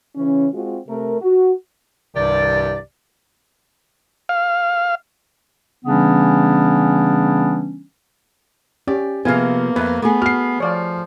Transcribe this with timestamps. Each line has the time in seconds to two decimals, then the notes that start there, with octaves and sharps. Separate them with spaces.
0.16 C#3 E3 C#4
0.53 G#3 C4 F4 F#4
0.88 C3 A3 A#4
1.21 F#4
2.15 C2 G2 C3 D#3 G4 D5
4.29 F5
5.85 C#3 E3 G3 B3 C#4 D4
8.87 C#4 G4 D5
9.25 C3 F3 A#3 B3 G#4 F5 G#5
9.76 F2 B4 E5
10.02 A3 B3 G#4
10.22 F#4 F6 C7
10.60 F3 C#5 D5 F5